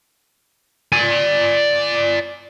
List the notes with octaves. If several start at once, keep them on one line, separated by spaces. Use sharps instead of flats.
D5 G#5